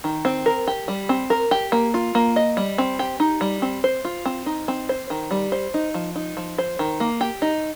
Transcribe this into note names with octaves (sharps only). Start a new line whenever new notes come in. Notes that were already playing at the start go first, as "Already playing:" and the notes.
D#3
C4
A#4
G4
G3
C4
A#4
G4
A#3
F4
A#3
D#5
G3
C4
G4
D#4
G3
C4
C5
F4
C4
D#4
C4
C5
D#3
G3
C5
D#4
F3
D#4
F3
C5
D#3
A#3
G4
D#4